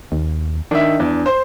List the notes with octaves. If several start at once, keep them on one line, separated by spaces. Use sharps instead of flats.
D#2
D#3 D4 E5
E2
C5